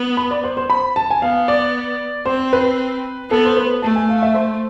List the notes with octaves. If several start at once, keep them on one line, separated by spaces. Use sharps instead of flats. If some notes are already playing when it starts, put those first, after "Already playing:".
Already playing: B3
B5
D5
C5
C5
B5
A5
G#5
B3 F5
D5
C4 C5
B4
B3 A4
C5
B4
A3 A5
G#5
F5
E5
C5